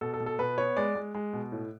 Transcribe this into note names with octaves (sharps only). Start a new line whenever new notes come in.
B2 A4
A4
B2
A4
B2 B4
B3 C#5
G#3 D5
G#3
G#3
B2
A2